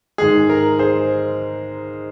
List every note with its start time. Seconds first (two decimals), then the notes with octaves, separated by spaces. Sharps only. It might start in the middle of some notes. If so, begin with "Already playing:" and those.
0.18 G#2 D#3 G#3 G#4
0.50 A#4
0.79 G#4 C5